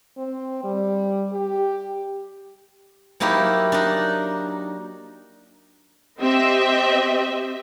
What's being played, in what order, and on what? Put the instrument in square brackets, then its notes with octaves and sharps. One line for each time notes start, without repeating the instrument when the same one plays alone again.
[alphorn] C4
G3
G4
[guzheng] F#3 A#3 D#4 E4 G4
D4 D#4
[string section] C4 G4 D#5 E5